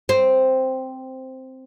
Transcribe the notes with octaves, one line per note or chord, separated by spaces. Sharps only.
C4